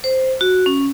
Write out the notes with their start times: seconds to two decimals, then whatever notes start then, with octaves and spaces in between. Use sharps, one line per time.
0.04 C5
0.41 F#4
0.66 C#4